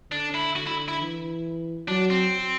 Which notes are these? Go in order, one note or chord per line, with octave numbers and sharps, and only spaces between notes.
D3 D4
E4
D3 F#4
E4
E4
E3
F#3 D4
C4